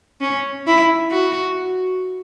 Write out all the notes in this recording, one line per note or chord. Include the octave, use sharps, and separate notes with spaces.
C#4
E4
F#4